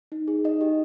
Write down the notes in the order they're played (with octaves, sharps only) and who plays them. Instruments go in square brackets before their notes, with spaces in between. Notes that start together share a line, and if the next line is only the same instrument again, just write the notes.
[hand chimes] D#4
G#4
D#4 D#5
G4